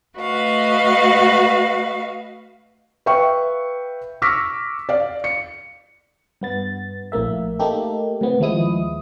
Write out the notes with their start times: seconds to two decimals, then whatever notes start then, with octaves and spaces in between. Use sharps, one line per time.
0.18 A3 F#4 B4 D#5 F5
3.06 B4 E5 F5 G5 C#6
4.22 C#6 D6 E6 F6 A#6 B6
4.89 D5 F5
5.24 C#7
6.41 G2 B3 A6
7.12 A#1 A2 A#3 E5
7.59 A3 A#3 D#4 G4 A4
8.21 A2 C3 B3
8.40 D#2 F3 G#3 E4 D#6